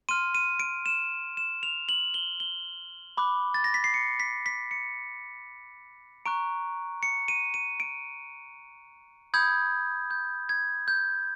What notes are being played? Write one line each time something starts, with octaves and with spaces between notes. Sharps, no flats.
C6 F6 D#7
D#7
D7
E7
E7
F7
F#7
G7
G7
B5 D6 F#6
A6
A#6
B6
C7
C#7
B6
B6
C#7
A#5 C#6 F#6 D7
C#7
D#7
D#7
D7
B5 D#6 G6 G#6
G6
G#6
G6